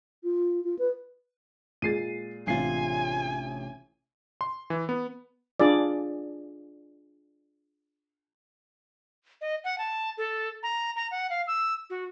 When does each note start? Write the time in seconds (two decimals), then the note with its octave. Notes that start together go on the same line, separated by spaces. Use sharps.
0.24 F4
0.64 F4
0.79 B4
1.82 A#2 G#3 A6 C7 D#7
2.47 A1 C3 D4 F4 G#5 C7
4.41 C6
4.70 E3
4.89 B3
5.60 D4 F4 G#4 D5
9.41 D#5
9.64 F#5
9.78 A5
10.18 A4
10.63 A#5
10.96 A#5
11.11 F#5
11.30 F5
11.47 E6
11.90 F#4